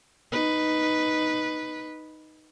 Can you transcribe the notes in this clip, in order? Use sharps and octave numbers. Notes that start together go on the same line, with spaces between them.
D#4 B4